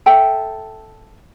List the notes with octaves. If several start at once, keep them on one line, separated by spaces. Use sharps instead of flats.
A4 E5 G5